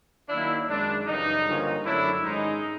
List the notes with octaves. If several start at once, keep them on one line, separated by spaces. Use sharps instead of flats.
D#3 F#3 A#3 D4 E4
F#2 D#3 G#3 D4
F#2 C#3 E3 G3 D#4
G2 D3 F3 A#3 C#4
F#2 D3 F#3 A3 D4 E4
G#2 D#3 G#3 C#4 D#4